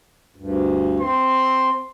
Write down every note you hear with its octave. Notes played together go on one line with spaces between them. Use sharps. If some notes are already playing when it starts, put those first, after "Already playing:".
D2 G2
C4 C6